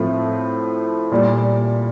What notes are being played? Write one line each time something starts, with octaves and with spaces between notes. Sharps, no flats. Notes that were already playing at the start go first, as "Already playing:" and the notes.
Already playing: A2 F3 A3 C4 F4
A#2 G3 A#3